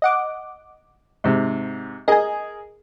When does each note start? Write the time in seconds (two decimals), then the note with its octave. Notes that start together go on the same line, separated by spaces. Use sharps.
0.02 D#5 F#5 D6
1.24 G#2 C3
2.08 G#4 A#4 D#5 G#5